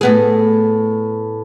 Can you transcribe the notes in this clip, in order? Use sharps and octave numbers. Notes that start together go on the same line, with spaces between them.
A2 B3 G#4